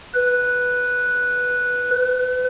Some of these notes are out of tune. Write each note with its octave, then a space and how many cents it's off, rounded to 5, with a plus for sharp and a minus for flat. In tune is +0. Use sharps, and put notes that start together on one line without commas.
B4 -5
B4 +35